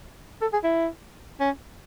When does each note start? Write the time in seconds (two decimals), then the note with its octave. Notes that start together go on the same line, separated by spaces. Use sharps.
0.42 A4
0.53 G#4
0.64 E4
1.40 C#4